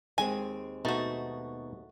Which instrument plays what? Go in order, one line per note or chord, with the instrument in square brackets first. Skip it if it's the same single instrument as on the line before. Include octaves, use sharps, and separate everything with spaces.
[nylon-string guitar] D#2 G#3 C4 [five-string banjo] G#5
[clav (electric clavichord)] B2 D#4 A5 [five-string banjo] A3 F#4